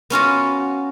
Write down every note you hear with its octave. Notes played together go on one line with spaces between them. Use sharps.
B3 C#4 F4 F#4